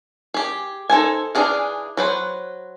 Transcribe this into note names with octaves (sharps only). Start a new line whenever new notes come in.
G4 G#4
D#4 A4 C5 G#5
E3 D4 F#4 G#4 F5
F#3 B4 C5